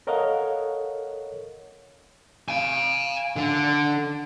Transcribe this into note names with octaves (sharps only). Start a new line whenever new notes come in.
A4 A#4 C#5 D#5 F5 F#5
F5 G#5
D3